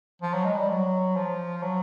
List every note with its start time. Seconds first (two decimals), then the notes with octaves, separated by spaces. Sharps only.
0.22 F3
0.34 F#3
0.45 G#3
0.57 G3
0.69 F#3
1.16 F3
1.62 F#3